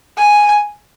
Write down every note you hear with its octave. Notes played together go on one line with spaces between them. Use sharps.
G#5